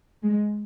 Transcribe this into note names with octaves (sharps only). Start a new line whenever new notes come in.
G#3